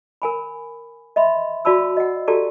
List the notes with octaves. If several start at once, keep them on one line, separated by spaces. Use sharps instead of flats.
A#4 G#5 B5
D#5 E5 B5 C6
F#4 D5 A5 B5 E6
D#5 F#5
F#4 G4 A4 D5 A5 A#5